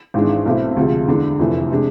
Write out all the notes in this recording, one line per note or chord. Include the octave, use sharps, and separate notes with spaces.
G#1 G#2 E3 G#3 D4
B1 B2 A3 C4 E4
D2 C3 F3 G#3
E2 D3 G#3 D4
F1 F2 E3 A3
C3 G#3 D4